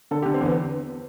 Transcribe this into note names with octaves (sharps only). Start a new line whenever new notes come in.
D3 A4
G4
D3
C4
E2 B3